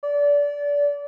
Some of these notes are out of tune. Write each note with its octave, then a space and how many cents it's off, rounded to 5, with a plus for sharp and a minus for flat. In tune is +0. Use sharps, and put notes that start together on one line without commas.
D5 -25